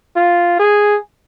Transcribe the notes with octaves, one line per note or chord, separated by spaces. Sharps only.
F4
G#4